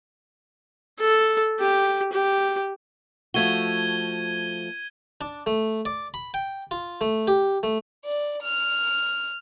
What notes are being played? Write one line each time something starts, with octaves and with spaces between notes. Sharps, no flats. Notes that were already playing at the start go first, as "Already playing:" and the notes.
A4
G4
G4
F3 A3 F#4 G#6 D#7 G7
D4
A3
D5
B5
G5
F4
A3
G4
A3
D5
F6